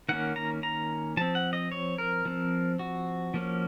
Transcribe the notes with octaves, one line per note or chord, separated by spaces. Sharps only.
D#3 A#3 C#4 F#5
A#5
A#5
F3 C4 A5
F#5
D#5
C#5
A#4
F3 C4
F#4
F3 A#3 C#4